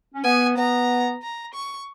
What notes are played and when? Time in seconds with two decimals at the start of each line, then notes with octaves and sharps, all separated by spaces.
0.14 C#4
0.24 B3 G#5
0.56 B3 A#5
1.22 A#5
1.54 C#6